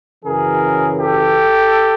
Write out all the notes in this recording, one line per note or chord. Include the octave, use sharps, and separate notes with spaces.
F#2 C#3 E3 G#4 A#4
G4 A4